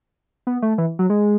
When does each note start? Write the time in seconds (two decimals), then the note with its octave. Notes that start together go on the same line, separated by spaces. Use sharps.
0.47 B3
0.62 A3
0.78 E3
0.99 F#3
1.10 G#3